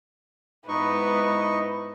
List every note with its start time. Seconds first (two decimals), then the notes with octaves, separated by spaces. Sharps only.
0.68 G#2 B3 D#4 E4 B4 D#5 C#6